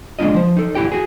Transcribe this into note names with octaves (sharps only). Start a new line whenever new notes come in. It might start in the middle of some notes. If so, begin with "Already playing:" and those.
G#3 A#3 D4 F4 D#5
F3 C5
D#4 A4
E2 A#2 E4 G4 G5
F#4 G#4